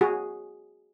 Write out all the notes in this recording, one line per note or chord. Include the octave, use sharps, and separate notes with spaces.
F#4 G#4